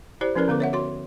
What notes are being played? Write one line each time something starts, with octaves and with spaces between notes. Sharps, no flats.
E4 G4 C5 D5
F3 C#4 E4 A#4 B4 D5
D3 B3 B4 D6
C#5 E5 F#5
F#4 C#5 C6